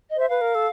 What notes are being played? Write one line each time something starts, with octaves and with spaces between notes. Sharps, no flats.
D#5
C5 E5
B4 F5
A#4
A4